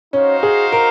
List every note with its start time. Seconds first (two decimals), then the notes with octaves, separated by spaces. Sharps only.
0.13 C#4 D#4 F#4 C5 F5
0.43 G#4
0.72 A#4